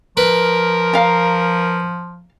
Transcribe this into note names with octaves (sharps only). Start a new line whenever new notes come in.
F3 A#4 B4
F5 A#5